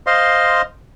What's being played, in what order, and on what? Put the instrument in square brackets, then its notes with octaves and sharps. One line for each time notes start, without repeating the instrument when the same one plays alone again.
[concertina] C5 D#5 F5 C6